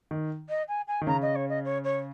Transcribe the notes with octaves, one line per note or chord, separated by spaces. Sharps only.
D#3
D#5
G#5
G#5
D#3
C#3 A#5
D#5
C#5
D#5
C#5
C#5